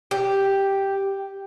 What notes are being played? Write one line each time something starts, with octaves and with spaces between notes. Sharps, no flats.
G4